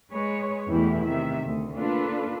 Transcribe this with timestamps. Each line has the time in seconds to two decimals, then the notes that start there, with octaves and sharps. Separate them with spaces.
0.12 G#3 B4 C#5
0.69 E2 B2 E3 A3 E4 G4
1.03 C3 D#3 E5
1.42 D2
1.75 A#3 D4 F4 A4 B4